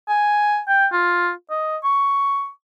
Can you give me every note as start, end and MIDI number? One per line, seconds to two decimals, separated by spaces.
0.09 0.60 80
0.68 0.87 79
0.92 1.31 65
1.50 1.77 75
1.84 2.49 85